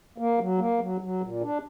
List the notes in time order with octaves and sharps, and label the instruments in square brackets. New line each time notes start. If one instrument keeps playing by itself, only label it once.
[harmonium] A#3
F#3
A#3
F#3
F#3
A#2
D4